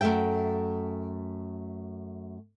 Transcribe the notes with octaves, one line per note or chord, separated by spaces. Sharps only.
F#2 F3 A3 E5 G5